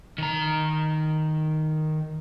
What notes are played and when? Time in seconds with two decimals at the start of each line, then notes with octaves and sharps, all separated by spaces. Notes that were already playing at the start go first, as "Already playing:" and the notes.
0.18 D#3 A#5